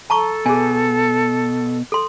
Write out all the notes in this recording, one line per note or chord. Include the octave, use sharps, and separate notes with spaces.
A4 A5 A#5 C#6
B2 G#4 G#5
A4 C6